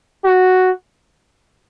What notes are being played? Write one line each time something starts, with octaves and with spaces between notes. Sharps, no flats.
F#4